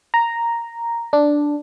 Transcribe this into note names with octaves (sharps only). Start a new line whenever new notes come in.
A#5
D4